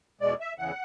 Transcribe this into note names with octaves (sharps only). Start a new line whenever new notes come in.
E2 B2 G#3 D5
E5
E2 C#3 E3 F#5